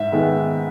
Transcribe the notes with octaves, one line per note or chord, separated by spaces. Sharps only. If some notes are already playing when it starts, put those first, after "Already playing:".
Already playing: G#2 E5
D#3 G#3 B3